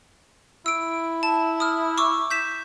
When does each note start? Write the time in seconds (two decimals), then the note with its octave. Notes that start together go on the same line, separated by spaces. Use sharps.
0.66 E4 E6 D7
1.23 A5
1.60 D#6 F6
1.98 C#6 D6 E6
2.31 G6 B6 E7